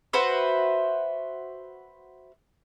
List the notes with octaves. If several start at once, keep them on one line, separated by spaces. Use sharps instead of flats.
F#4 B4 C5 E5